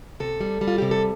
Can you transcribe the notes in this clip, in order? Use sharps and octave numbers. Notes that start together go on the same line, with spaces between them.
C3 A4
G3
G3
F4
C3 G4
A4